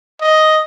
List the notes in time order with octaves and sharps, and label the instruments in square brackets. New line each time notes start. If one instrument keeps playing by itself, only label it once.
[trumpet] D#5